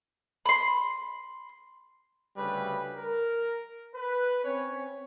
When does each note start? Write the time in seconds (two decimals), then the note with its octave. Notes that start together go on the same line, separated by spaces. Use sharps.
0.46 B5 C6
2.38 D2 C#3 G3 B4
2.95 A#4
3.95 B4
4.44 C4 C#4 C#5